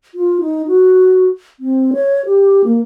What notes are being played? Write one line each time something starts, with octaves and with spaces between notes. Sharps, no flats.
F4
D#4
F#4
C4
C#5
G4
A#3